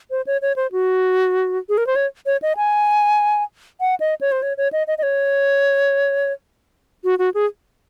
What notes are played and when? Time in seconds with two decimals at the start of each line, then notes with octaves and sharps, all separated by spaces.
0.11 C5
0.27 C#5
0.42 C#5
0.56 C5
0.72 F#4
1.69 G#4
1.78 A#4
1.87 C5
1.96 C#5
2.26 C#5
2.42 D#5
2.57 G#5
3.81 F#5
4.00 D#5
4.21 C#5
4.32 C5
4.42 C#5
4.57 C#5
4.72 D#5
4.87 D#5
4.98 D#5
5.03 C#5
7.04 F#4
7.19 F#4
7.34 G#4